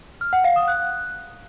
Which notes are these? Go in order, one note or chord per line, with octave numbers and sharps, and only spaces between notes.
F6
F#5
F5
D#6
F#6